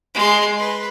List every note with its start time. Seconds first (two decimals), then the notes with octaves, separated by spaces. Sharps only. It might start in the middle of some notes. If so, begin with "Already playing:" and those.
0.15 G#3 C6
0.58 B4